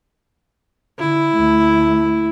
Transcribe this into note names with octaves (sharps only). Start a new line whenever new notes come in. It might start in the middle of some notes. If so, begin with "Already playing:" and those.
D3 E4
D2 A3